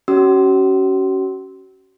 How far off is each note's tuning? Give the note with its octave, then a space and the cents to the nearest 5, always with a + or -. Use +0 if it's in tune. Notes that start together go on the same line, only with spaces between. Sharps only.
C#4 +0 F#4 +40 E6 -20